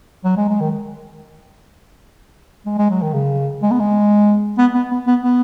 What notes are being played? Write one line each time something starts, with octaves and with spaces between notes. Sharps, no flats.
F#3
G#3
G#3
D#3
G#3
G#3
F#3
D#3
C#3
G#3
B3
G#3
B3
B3
B3
B3
B3